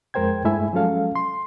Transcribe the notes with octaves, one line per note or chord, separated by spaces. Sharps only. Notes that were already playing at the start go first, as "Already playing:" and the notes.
F2 G#3 A#4 C5 G5 G#6
G2 G#3 A3 E4 E5 G#5
F3 F#3 G#3 C#4 A4 F5
C6